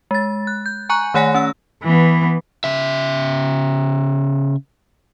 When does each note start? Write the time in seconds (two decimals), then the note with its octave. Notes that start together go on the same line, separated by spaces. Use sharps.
0.11 G#3 A6
0.47 F#6
0.66 G6
0.90 G#5 A#5 C#6 F#6
1.14 D#3 A3 C#5 F#5 G#5 A#6
1.35 C#4 E6
1.83 E3 B3
2.64 C#3 E5